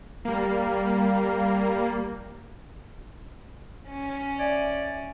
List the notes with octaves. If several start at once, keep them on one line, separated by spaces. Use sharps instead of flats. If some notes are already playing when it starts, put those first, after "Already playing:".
G3 A#3
C#4
D5 E5 G#5 G#6